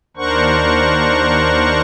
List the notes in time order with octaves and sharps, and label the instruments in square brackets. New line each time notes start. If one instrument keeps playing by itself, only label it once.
[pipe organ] D#2 D4 A#4 C5 F#5 C#6